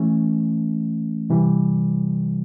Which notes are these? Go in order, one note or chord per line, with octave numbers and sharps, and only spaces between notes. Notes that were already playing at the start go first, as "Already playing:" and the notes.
Already playing: E3 A3 C#4
C3 E3 G3